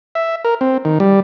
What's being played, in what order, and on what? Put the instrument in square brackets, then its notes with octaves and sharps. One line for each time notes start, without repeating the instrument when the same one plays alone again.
[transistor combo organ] E5
A#4
C4
D#3
G3